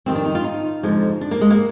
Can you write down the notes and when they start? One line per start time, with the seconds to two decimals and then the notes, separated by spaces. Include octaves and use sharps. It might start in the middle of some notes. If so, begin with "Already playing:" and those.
0.06 F2 D#3 G3 C4
0.16 D4
0.25 D#4
0.35 F4
0.44 D#4
0.83 F2 D3 F3 G#3
1.21 D4
1.31 A#3
1.41 G#3
1.50 A#3